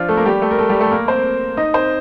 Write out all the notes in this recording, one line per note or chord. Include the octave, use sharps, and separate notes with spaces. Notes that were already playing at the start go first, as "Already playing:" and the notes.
Already playing: F3 D4 F4
A3 A4
A#3 A#4
G3 G4
A3 A4
A#4
A3 A4
G3 G4
A3 A4
A#3 A#4
C4 C5
D#4 D#5
C4 C5